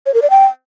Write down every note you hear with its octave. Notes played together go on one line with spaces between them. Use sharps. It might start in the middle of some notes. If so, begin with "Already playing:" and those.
C#5
A#4
D5
G5